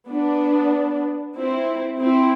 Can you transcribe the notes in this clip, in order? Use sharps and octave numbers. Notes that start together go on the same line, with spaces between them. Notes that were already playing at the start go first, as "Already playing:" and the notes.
B3 D4
C4 E4
C4 E4